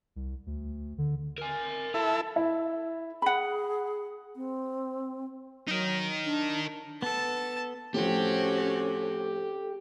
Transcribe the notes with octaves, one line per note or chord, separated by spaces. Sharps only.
C2
D2
D3
A#4 G#5
E4 F4 A4 A5
E4
G#4 F#5 B5
C4
F#3 D#4 A#4
D4
B3 A4 A5
A2 F3 C4 C#4 F#4 G4 A4